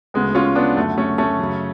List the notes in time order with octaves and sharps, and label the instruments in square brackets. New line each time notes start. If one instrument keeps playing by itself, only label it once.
[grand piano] D2 C#3 G#3 B3
C#4 F4
B3 D4
F#2 D3 A3
A3 C#4
A3 C#4
F#2 C#3